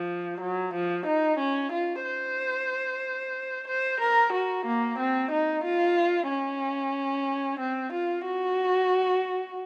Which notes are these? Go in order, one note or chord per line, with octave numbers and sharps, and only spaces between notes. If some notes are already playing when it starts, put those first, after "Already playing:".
Already playing: F3
F#3
F3
D#4
C#4
F4
C5
C5
A#4
F#4
A#3
C4
D#4
F4
C#4
C4
F4
F#4